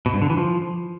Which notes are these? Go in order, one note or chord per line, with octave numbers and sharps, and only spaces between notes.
B2
G2
D3
E3
F3